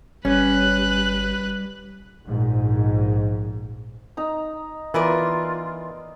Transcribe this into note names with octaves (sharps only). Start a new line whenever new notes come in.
G1 G3 C#4 B4 F#6
A#1 G#2
D#4 A#5
E3 B3 F4 A#4 D5